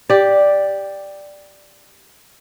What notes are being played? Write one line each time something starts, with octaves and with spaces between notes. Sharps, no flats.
G4 D5